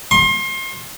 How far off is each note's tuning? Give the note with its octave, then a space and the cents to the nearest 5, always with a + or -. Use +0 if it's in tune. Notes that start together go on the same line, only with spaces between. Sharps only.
C6 +35